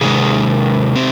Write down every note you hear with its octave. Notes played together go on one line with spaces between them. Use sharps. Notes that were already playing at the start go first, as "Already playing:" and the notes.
C3 D#3 G#3 G#4
C4